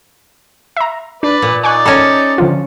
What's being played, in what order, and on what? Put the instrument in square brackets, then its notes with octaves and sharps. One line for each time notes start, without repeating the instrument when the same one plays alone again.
[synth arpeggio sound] E5 A#5
[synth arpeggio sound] D4 [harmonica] B4 D5
[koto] A#2
[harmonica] D#4 D5 [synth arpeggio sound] G#5 C#6 F#6
[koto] C#4 A4 [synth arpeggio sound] C#5 A#5
[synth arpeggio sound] D3 F3 F4